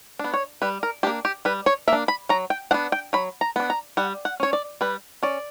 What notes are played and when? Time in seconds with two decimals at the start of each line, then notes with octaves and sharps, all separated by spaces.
0.19 B3 D4
0.34 C#5
0.62 G3 B4
0.83 A#4
1.03 A#3 D4 G4
1.25 G4
1.45 G3 B4
1.66 C#5
1.88 A#3 D4 E5
2.08 B5
2.29 F#3 A#5
2.50 G5
2.71 B3 D4 F#5
2.92 G5
3.13 F#3 B5
3.41 A#5
3.56 B3 D4
3.70 A#5
3.97 G3 F#5
4.25 F#5
4.40 C#4 C#5
4.53 D5
4.81 G3 B4
5.23 C#4 D5